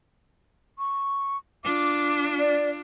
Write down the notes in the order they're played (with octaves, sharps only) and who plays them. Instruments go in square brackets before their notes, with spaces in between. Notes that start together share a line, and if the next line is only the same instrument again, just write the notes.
[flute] C#6
[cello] D4 F4 [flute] D6
[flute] D5